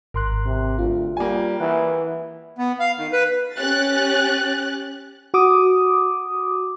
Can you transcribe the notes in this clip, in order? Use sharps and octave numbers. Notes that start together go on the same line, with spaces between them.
G#1 A#4 C6 F#6
C3
D2 F4
G3 A#3 G#5
E3 F#5
B3
F5
D#3
B4
C#4 G4 F#6 A6
F#4 D6 D#6